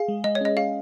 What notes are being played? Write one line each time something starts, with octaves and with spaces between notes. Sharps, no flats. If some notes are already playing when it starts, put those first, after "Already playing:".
Already playing: G#4 F5
G#3
G#3 D#5
C#5
C#4 D#5
G#4 F5